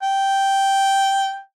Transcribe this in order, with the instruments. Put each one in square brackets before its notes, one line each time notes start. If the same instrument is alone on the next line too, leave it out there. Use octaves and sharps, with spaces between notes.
[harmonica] G5